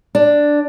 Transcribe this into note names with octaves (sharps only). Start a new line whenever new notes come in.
D4